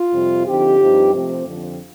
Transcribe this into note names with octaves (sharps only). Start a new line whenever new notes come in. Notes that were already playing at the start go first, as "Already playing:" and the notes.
Already playing: F4
F2 C3 G3
D3 F3 C4 D#4 G4
G2 F3 C4 D#4
C3 F3 A3 C4
F2 D3 F3 C4